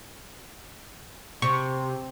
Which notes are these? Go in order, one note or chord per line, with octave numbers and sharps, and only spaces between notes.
C3 C#6